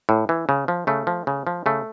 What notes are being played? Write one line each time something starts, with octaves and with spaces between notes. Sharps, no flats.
A2
E3
C#3
F3
C#3 A3
F3
C#3
F3
C#3 A3